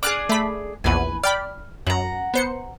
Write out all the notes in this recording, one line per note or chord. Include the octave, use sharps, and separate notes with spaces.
D4 G4 G#4 D6 F6 F#6
A3 B5
A#1 E2 B4 G#5
D5 G5 B5 F6
F#2 F#5 A#5
B3 C5 C#7